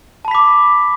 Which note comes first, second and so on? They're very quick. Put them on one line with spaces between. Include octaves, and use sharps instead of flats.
A5 B5 B6 D6